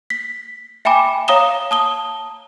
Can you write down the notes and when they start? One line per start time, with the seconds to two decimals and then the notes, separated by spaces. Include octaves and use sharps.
0.10 B6
0.85 E5 G5 G#5 B5 D6
1.28 C#5 F5 A#5 D#6 E7 G7
1.71 A5 D#6 G7